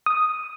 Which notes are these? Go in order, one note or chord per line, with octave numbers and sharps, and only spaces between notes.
D#6